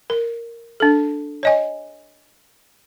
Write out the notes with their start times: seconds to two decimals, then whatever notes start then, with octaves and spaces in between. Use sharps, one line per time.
0.10 A#4
0.80 D4 A4
1.43 C#5 D#5 G#5